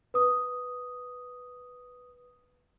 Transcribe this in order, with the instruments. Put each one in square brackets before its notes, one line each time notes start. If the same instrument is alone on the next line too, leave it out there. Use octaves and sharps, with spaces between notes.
[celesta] B4 D#6